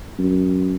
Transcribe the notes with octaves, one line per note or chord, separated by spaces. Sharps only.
F#2